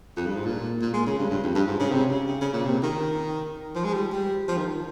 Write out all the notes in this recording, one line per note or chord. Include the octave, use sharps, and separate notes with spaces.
F2
G2
G#2
A#2
A#2
G#3
C#3
G2
G2
F2
G2
G#2
C#3
C3
C#3
C#3
C#3
A#2
C3
D#3
F3
G#3
G3
G3
F3
D#3